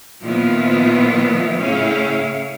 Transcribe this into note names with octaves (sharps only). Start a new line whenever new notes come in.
A#2 D#3 F3 B3 E4 F4
A2 C#3 C#4 E4 C#5 F5